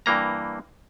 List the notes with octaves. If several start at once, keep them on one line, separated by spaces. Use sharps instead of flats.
G2 E3 A#3 A#5